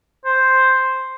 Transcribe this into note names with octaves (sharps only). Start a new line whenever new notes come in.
C5